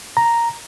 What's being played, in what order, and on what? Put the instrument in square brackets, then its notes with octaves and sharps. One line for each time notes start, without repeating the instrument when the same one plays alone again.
[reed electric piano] A#5